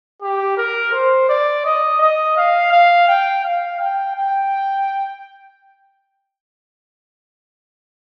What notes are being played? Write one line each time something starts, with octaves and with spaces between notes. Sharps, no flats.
G4
A#4
C5
D5
D#5
D#5
F5
F5
G5
F5
G5
G5